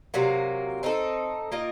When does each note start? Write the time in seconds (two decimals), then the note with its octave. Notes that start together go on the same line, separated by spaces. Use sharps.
0.14 C3 F#3 A#3
0.83 C4 D#4 A4
1.52 A#3 F4 A#4 D#5